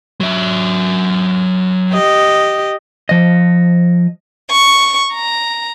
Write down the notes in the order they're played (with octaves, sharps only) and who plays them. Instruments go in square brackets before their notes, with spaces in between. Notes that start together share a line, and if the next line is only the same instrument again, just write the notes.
[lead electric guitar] F#3 E5
[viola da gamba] G4 D#5
[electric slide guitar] F3 D#5
[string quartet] C#6
A#5